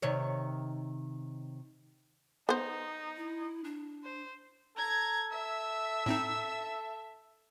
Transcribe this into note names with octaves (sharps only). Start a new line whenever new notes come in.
C3 D#3 C#5
B3 D#4 C5
E4
D4
C5
A4 A#5 G#6
E5 E6
A2 C4 D#4